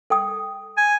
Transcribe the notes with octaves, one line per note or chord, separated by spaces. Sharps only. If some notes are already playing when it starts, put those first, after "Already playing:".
A4 G5 D#6
G#5